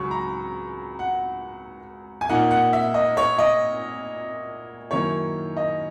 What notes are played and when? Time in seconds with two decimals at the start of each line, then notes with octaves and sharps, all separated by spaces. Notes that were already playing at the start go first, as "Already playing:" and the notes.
Already playing: C#2 C#3 F#3 C#6
0.11 A#5
0.99 F#5
2.21 G#5
2.29 A#2 A#3 D#4 F#5
2.51 F#5
2.73 E5
2.94 D#5
3.17 C#5
3.38 D#5
4.91 F#2 D#3 A#3 E4 C#5
5.57 D#5